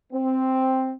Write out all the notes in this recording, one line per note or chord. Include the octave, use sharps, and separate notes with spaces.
C4